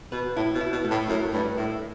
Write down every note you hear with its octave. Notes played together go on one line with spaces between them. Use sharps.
B2 B4
A2 E4
B2
E4
B2
A3
A2
F#2 E4
G2 A3
A2 E4